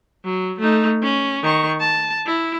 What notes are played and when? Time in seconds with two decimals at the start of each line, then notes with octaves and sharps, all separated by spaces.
0.25 F#3
0.59 A3 D#4
1.02 C#4
1.43 D#3 C#6
1.80 A5
2.26 E4